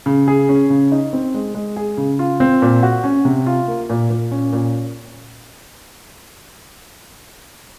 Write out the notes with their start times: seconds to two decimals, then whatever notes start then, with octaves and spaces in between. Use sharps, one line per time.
0.06 C#3
0.28 G#4
0.49 C#4
0.70 C#3
0.92 D#4
1.13 C4
1.34 G#3
1.55 G#3
1.76 G#4
1.97 C#3
2.19 F4
2.40 C4
2.62 A#2
2.83 F#4
3.04 C#4
3.25 C3
3.47 F4
3.68 A#3
3.90 A#2
4.10 A#2
4.32 C#4
4.53 A#2